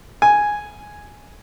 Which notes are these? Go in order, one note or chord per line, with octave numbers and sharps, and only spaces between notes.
G#5